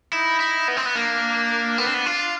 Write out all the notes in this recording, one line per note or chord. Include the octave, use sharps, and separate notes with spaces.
D#4 E4
E4
B3
C4
B3
A#3 D4
B3
C4
B3
F4